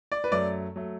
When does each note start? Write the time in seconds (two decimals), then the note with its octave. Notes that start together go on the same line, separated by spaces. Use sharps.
0.12 D5
0.24 B4
0.32 F#2 F#3 A3 D5
0.76 F#3 A3